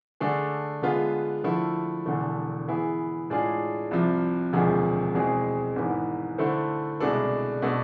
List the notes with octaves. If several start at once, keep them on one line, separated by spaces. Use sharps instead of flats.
D3 A3 D4 G#4
D3 G#3 B3 F4
D3 F3 A3 E4 A4
E1 E2 D3 A3
E3 B3 E4 G#4
A2 G#3 D4 F4 G#4
C2 C3 F3
E1 D2 C3 F3 G#3
E2 B2 G#3 C4 G#4
G#1 G#2 E3 B3 E4
D3 A3 E4 A4 C5
C2 B2 G#3 D4 A4
B2 A3 D4 A4